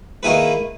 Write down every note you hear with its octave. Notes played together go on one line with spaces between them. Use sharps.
D#3 A#3 E4 G#4 B4